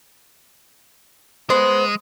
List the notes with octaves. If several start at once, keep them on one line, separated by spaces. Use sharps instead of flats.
G#3 B3 C5